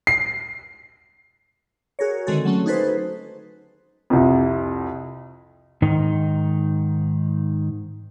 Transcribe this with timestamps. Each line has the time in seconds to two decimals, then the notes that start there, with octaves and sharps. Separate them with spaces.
0.07 C7
1.99 F#4 G#4 A#4 C#5
2.27 D3 D#3 G#3 C4 F#4 A4
2.45 F#3 A3 C#4 F#4
2.66 D#4 F#4 G#4 A4 B4 C5
4.10 C2 F2
5.82 G#2 D#3 D#4